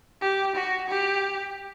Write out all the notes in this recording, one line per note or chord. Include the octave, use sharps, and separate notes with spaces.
G4
F#4
G4